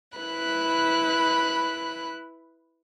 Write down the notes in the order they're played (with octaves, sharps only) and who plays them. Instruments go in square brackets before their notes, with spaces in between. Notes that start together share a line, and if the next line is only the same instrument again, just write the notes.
[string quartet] E4 B4 B5 F#6